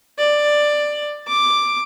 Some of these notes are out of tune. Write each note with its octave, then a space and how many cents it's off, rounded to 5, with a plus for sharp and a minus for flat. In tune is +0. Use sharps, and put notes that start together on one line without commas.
D5 +10
D6 +5